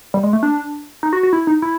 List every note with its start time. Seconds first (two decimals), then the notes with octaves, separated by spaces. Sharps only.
0.14 G3
0.23 G#3
0.33 A3
0.43 D4
1.03 D#4
1.13 F#4
1.23 F#4
1.33 E4
1.47 D#4
1.62 E4